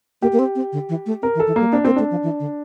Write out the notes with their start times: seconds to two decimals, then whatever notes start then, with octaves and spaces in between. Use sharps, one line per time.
0.22 A#3 G4
0.33 A#3
0.39 C4
0.55 C4
0.72 D3
0.89 E3
1.06 A3
1.22 C4 A#4
1.35 E3
1.40 A4
1.47 E3
1.56 G3 A#3
1.72 C4 D4
1.85 A#3 C4
1.96 A3 D4
2.11 F3
2.23 E3
2.40 D3